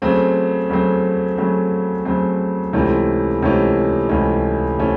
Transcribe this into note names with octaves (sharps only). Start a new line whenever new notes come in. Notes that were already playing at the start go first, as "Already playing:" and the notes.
C#3 F#3 A3 C4
C#3 F#3 A3 C4
C#3 F#3 A3 C4
C#3 F#3 A3 C4
C#2 C3 E3 A3 C#4
C#2 C3 E3 A3 C#4
C#2 C3 E3 A3 C#4
C3 E3 A3 C#4